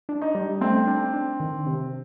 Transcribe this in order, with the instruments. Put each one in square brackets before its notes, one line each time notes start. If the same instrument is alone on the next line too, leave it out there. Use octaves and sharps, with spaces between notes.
[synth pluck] D4
[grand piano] D#4
[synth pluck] G3
[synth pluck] A3 [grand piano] C4
[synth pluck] D4
D4
D#3
C3